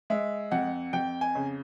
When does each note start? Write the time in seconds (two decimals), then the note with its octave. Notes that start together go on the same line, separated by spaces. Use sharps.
0.10 G#3 E5
0.51 F2 F#5
0.93 F2 G5
1.21 G#5
1.35 C#3